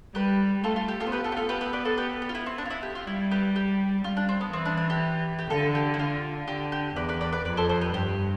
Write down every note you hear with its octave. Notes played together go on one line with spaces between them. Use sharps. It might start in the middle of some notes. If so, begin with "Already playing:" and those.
G3 G4 B4
A3 F4 A4
F4
G4
F4 A4
C5
B3 G4 B4
F4 A4
G4
F4 A4
G4 B4
G4 B4
B4 D5
A4 C5
G4 B4
G4
F4
E4
C4
D4
F4
E4
G4
F4
G3 E4
G4 B4
G4
G3 F4
D4
C4
B3
E3 C4
D4
D4
G4
G4
D3 F4 A4
G4
E4
D3 F4
D3 G4
G4
E2 B4 D5
B4 D5
B4 D5
B4 D5
F2 B4 D5
A4 C5
A4 C5
G4 B4
G2 G4